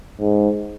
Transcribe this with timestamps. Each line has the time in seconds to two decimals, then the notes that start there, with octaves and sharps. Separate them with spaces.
0.20 G#2